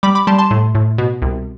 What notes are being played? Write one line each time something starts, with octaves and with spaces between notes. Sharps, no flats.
G3 B5 D6
B5 D6
G3 A5 C6
A5 C6
A2
A2
B2
C2